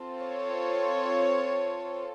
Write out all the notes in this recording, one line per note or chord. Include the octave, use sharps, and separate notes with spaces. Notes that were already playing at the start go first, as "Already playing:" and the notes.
Already playing: C4 F4 A4
C#5